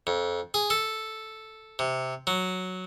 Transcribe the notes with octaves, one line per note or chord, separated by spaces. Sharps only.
F2
G#4
A4
C3
F#3